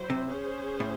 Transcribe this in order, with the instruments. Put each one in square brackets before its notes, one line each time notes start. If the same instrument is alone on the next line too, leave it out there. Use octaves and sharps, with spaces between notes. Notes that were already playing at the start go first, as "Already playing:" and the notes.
Already playing: [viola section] F#3 E4 C5
[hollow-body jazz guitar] C3
[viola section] C#4 G#4 C5
[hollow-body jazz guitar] A2